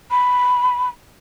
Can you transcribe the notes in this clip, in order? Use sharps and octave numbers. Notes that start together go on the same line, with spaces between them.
B5